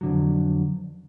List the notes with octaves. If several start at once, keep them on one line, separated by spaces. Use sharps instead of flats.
F2 D3 F#3